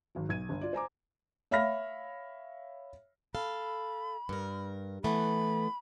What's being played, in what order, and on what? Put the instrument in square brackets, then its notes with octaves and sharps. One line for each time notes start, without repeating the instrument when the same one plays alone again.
[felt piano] G#1 F#3
B1 G#6 D#7
G1
F4 D5
C5 G#5 A#5 D6
C#5 E5 F5 B5 F6 A#6
[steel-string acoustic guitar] A4 F5 [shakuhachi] B5
[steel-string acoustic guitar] G2 A#4
[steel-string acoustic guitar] E3 A3 B3 [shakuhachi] B5